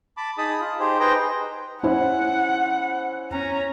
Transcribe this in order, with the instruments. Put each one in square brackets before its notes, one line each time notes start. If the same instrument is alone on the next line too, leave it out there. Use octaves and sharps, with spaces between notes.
[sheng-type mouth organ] A5 B5 D6
D#4 G#4 A5 B5 D#6
F4
D#4 G4 G#4 C5
D#4 G#4 B4 C5 G5 A#5
[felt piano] C#4 E4 C5 [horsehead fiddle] F#5
[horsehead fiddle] C#4 A#5